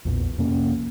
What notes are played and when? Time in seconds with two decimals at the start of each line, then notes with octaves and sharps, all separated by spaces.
0.05 A#1 E2 A#2
0.38 F2 C3 A#3 C#4